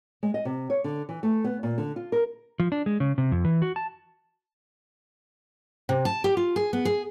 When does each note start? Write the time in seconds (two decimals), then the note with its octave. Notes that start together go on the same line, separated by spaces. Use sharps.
0.23 G#3
0.34 D#5
0.45 C3
0.70 C#5
0.84 D3
1.09 E3
1.23 A3
1.44 B3
1.63 A#2
1.78 D3
1.96 F4
2.12 A#4
2.60 F3
2.72 D4
2.86 G#3
3.00 C#3
3.18 C3
3.32 F2
3.45 E3
3.62 F#4
3.76 A5
5.89 C3
6.05 A5
6.24 G4
6.37 F4
6.56 G#4
6.73 B3
6.85 G#4